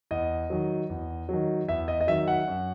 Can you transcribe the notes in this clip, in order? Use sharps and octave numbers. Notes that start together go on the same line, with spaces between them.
E2 D#5
D#3 F#3
E2
D#3 F#3
E2 E5
D#5
D#5
D#3 F#3 E5
F#5
F#2